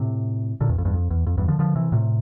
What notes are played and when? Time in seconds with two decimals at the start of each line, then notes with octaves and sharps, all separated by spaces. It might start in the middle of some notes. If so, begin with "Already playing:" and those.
Already playing: A2 C3
0.61 A#2 D3
0.69 E2
0.78 F2
0.85 E2 G2
0.93 F2
1.10 E2
1.27 F2
1.38 E2 G2
1.48 D3 F3
1.59 D3 F3
1.76 C3 E3
1.92 A2 C3